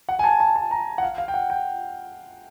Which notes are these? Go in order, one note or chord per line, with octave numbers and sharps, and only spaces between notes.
F#5
G#5
A5
A5
A5
A#5
F#5
F5
F5
G5
F#5
G5